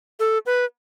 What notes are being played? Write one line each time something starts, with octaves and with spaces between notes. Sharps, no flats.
A4
B4